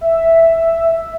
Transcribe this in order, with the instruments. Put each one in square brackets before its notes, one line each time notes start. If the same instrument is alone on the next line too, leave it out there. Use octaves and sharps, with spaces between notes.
[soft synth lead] E5